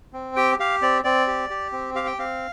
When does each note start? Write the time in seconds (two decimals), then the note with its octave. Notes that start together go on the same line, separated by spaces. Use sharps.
0.13 C4
0.36 G4 G5
0.59 G4 F5
0.82 C4 D5
1.04 C4 D5
1.27 G4
1.50 G4
1.72 C4
1.95 G4 F5
2.06 G5
2.18 C4 F5